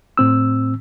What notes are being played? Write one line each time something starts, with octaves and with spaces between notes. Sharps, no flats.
A2 C4 E6